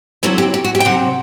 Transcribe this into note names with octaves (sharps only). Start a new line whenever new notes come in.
D3 F#3 C4 E4 A4
G4
G4
F#4
G4
G5
C3 F#3 C4 F#5